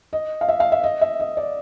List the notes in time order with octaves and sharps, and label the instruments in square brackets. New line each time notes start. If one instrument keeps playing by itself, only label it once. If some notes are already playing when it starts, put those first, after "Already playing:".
[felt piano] D#5
F5
E5
F5
E5
D#5
E5
D#5
D5